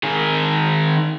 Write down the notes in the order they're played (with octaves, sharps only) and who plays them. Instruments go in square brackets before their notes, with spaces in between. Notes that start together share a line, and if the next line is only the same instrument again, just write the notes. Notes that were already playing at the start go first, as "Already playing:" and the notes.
[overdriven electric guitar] D#3 G#4